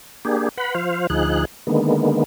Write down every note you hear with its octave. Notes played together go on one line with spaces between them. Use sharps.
A#3 D4 G4 G#4
B4 F#5 B5
F3 C5 F5
D2 F3 D#4 G#4 F#6
D3 D#3 G#3 A#3 B3